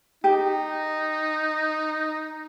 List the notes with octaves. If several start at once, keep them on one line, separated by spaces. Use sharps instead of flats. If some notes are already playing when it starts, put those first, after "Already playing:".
D#4 G4